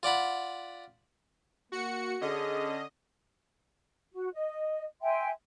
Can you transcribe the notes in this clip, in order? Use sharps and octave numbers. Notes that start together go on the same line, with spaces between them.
F4 D5 F#5 B5
A#3 F#4 C#7
D3 C#4 G#4 D#5
F#4
D#5
E5 G5 G#5 C6